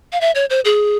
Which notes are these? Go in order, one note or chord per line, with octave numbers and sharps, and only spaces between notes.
F5
E5
C#5
C5
G#4